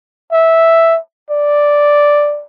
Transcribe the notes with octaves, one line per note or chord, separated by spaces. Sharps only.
E5
D5